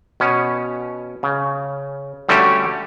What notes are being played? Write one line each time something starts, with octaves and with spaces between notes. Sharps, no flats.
B2 C#4
C#3
D3 G3 A3 C#4 F#4 G4